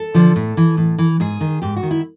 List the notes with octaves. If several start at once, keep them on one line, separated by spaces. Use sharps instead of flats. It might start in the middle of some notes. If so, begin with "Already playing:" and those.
Already playing: A4
D3 F3
A2
E3
A2
E3
G#2 G#4
D#3
G#2 G4
F#4
D#3
E4